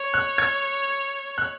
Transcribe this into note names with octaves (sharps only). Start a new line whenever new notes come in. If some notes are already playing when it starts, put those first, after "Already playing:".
Already playing: C#5
F#6
G#6
F#6